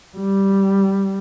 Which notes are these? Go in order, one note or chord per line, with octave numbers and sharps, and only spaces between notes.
G3